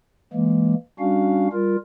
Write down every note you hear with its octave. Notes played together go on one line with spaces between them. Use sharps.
E3 G#3 A#3
G3 C#4 D4 F#4 F5
G3 F4 A#4